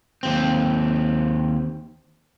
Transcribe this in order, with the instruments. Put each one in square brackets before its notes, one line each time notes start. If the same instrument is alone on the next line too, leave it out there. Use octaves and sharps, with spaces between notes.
[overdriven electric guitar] D#2 C4